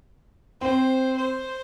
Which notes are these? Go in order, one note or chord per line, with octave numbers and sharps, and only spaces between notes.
C4 C5
C5